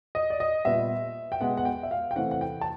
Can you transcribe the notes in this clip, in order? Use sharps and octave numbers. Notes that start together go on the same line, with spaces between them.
D#5
D5
D#5
A#2 G3 B3 E5
G5
B2 G#3 B3 F#5
F#5
G5
E5
F5
G5
C3 E3 A3 C4 F#5
F#5
G5
A5